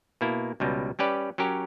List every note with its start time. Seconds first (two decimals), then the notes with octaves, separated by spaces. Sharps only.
0.21 B2 A#3 E4
0.60 C#2 B2 G3
0.99 G3 C#4 G4 B4 D5
1.38 F#3 C#4 G4 A#4